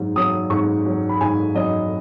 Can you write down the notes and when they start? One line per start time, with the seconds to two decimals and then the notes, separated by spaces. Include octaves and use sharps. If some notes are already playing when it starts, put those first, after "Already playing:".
Already playing: G#2 F#3
0.16 F#3 D#6
0.50 G#2 C#6
0.86 F#3
1.09 B5
1.21 G#2 G#5
1.54 F#3 D#5